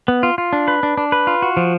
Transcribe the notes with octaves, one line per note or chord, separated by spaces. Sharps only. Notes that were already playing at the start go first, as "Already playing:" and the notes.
B3
F4
F4
D4
B4
D4
D4
B4
F4
F#4
F3